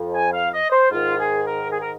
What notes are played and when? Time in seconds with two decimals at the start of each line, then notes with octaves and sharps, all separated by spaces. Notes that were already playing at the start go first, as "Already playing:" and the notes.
Already playing: F2 F3
0.13 G#5
0.32 F5
0.52 D#5
0.71 C5
0.91 G#2 D#3 F4
1.18 G#4
1.44 A#4
1.71 G#4
1.80 A#4